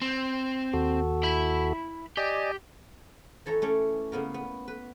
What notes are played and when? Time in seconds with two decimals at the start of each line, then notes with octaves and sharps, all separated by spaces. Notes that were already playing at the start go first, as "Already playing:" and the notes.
0.02 C4
0.74 D#2 F#4 A4
1.23 E4 B5
2.17 G4 D5 D#5 G#5
3.46 E3 A4 C#5 A#5
3.62 A3 C#4 C#5 D5
4.12 C#3 A#3 B3 A#4
4.34 B3
4.68 B4